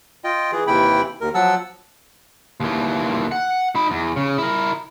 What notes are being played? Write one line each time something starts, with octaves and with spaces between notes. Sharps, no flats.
F4 D#5 G5
E3 G#4
D#2 C3 E3 E4 G5 B5
D#2 A#4
F3 F#3 F#5 A5 E6
D#2 E3
F#5
D#4 B5
E2
C#3
E4 A#4